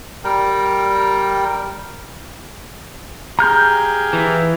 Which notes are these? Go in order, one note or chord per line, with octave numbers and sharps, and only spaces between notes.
G3 A#4 G5
G4 G#4 F5 A#5 F6 G6
E3